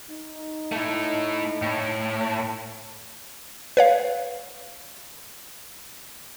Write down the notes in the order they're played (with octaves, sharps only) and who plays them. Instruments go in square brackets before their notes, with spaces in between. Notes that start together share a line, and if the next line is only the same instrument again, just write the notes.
[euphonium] D#4
[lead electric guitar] A3 E4
A2
[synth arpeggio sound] B4 C#5 F5